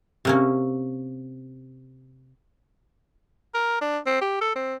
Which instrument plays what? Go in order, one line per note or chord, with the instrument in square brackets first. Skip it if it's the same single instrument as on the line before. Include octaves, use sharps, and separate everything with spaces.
[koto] C3 A#3 C#4
[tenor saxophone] A#4
D4
C4
G4
A4
C4